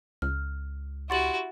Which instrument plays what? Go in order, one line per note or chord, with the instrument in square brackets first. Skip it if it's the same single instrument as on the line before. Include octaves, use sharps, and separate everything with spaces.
[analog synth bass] C#2 [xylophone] F6
[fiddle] E4 F#4 [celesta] G4 C6 C#6 [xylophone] F#5 A6 F#7